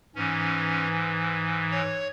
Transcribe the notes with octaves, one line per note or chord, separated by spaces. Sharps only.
G#2 E3 C#4
C#5